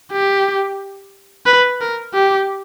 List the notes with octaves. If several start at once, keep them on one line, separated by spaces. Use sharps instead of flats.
G4
B4
A#4
G4